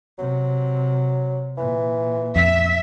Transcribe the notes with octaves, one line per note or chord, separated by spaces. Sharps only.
C3 F#3
A#2 E3
F2 E5